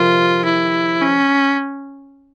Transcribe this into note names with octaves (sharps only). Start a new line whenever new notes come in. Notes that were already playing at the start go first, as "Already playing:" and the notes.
Already playing: F2 C3 D#3 F4
E4
C#4